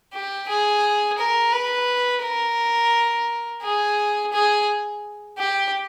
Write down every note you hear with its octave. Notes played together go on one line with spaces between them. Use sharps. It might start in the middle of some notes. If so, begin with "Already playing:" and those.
G4
G#4
A#4
B4
A#4
G#4
G#4
G4